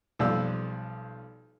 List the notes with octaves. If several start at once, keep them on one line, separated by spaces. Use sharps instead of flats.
B1 F3 G3 E6